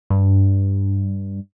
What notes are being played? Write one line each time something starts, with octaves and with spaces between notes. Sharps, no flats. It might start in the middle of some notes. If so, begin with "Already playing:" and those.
G2